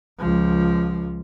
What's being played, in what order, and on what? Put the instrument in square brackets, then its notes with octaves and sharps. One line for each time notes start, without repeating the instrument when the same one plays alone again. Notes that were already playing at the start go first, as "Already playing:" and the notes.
[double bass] C#2 F3